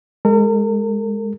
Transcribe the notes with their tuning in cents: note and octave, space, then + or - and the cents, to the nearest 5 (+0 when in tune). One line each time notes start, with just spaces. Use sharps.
G#3 -5 A#4 -40